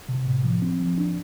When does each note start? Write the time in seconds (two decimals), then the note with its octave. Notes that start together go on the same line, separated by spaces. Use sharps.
0.09 C3
0.27 A2
0.44 F3
0.62 C4
0.80 F3
0.98 D4